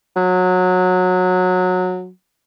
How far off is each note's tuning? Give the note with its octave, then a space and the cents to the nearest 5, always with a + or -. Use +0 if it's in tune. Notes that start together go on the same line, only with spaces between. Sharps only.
F#3 -20